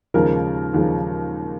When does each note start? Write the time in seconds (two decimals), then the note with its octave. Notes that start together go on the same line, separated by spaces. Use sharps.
0.14 D#2 C#3 F3 G#3 A#4
0.74 D#2 C#3 F3 G#3